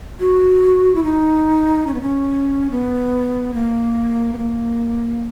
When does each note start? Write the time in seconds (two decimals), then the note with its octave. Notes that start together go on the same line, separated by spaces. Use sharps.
0.20 F#4
0.95 E4
1.04 D#4
1.87 C#4
1.94 B3
2.02 C#4
2.71 B3
3.54 A#3
4.33 B3
4.38 A#3